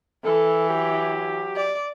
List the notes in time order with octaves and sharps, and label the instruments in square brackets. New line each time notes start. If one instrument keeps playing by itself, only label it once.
[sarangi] E3 [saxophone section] A4
[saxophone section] F#3 G4
[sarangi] D5